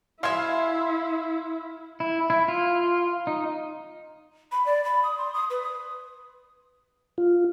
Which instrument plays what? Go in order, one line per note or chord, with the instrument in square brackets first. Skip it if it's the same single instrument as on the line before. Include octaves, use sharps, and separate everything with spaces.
[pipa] G#3 E5 [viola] E4 [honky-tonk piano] F5 C6 G#6
[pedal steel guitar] E4
E4
F4
D#4
[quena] B5
D5
B5
D#6
C6
D#6
B4
D#6
[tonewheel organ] F4